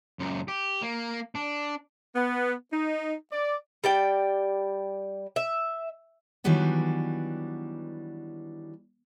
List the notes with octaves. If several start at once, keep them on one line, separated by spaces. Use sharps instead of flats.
C#2 F#2
G4
A#3
D4
B3
D#4
D5
G3 D5 G5
E5
D#3 E3 F#3 G3 B3 D4